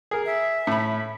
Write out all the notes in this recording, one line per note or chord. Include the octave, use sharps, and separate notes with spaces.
G#4 A#4
E5
A2 B5